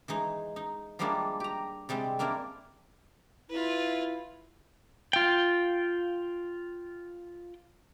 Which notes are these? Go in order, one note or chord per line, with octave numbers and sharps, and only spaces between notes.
E3 G#3 D#4
D#4
F3 G3 G#3 A#3 D4 E4
G4 A#5
C3 G3 G#3 C4
A#3 C4 D4 E4 A#4
E4 F4 B4
F4 G5